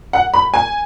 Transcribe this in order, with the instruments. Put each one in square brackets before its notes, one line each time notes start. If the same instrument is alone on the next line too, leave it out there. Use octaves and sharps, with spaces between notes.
[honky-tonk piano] F#5
B5
G#5